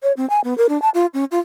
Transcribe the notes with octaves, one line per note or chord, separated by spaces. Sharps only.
C#5
C4
G#5
B3
A#4
D4
A5
F4
C#4
F4